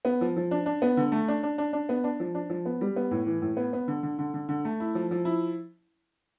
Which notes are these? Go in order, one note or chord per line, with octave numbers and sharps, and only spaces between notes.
B3
F3
F3
D4
D4
B3
D3
A3
D4
D4
D4
D4
B3
D4
F3
D4
F3
B3
G3
B3
A2
E3
A2
B3
B3
D3
D3
D3
D3
D3
A3
E4
F3
F3
E4